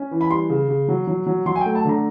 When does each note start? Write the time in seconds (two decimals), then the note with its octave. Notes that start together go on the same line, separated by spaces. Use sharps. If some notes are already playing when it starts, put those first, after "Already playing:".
Already playing: C#4
0.11 E3
0.21 B5
0.30 G3 C6
0.49 C#3
0.68 C#3
0.88 F#3
1.07 F#3
1.27 F#3
1.46 F#3 C6
1.56 G#5
1.61 A3 G5
1.75 A5
1.85 D3 A#5